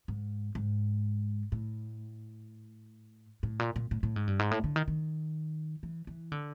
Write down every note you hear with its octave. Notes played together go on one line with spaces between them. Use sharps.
G#2
G#2
A2
A2
A#2
A#2
A2
A2
G#2
G2
G#2
A2
D3
D#3
D#3
E3
E3
D3